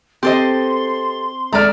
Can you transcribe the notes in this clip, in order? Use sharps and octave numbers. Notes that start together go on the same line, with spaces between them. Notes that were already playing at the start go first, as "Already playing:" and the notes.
C4 G4 A4 C5 D#5 C6
G#3 A3 D5 A#5 F6